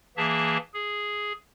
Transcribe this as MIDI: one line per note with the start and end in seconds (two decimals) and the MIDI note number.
0.17 0.58 52
0.17 0.58 58
0.17 0.58 68
0.17 0.58 76
0.17 0.58 81
0.74 1.33 68